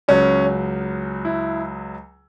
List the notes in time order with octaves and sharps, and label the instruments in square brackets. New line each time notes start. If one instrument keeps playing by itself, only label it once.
[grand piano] C#2 C#3 F#3 C#4
E4